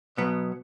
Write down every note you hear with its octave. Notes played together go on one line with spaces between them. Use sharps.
B2 F#3 B3